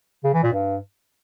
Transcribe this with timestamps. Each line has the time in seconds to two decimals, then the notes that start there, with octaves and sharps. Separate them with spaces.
0.24 C#3
0.34 E3
0.43 A#2
0.53 G2